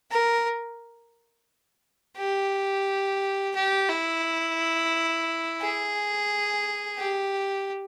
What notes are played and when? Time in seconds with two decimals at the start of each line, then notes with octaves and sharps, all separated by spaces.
0.11 A#4
2.18 G4
3.55 G4
3.89 E4
5.61 G#4
6.99 G4